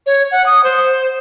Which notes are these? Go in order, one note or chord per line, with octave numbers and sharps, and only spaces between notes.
C#5
F#5
D#6
C5